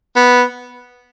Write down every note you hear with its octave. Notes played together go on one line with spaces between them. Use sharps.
B3